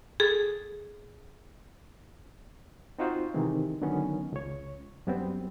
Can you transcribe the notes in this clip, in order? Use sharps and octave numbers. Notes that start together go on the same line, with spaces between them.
G#4 A4
C4 D#4 F4 F#4 C5
C3 D#3 E3 G#3 C4
D3 D#3 F#3 B3 C#4
C#2 C#5
F#2 G3 B3 C4